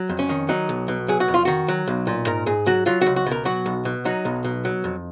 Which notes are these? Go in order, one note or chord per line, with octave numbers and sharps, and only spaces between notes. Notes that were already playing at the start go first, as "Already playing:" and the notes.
Already playing: F#3
F2
C#4
D#3
F#3 D#4
B1
B2
F#3 G#4
F#4
F2
F4
D#3 F#4
F#3
B1
A#2
G#2 A#4
G#2 G#4
F#3 F#4
F#3 F4
F#4
C#2
F#4
B2
A#4
F#3 F#4
B1
B2
F#3 D#4
B1
B2
F#3
F2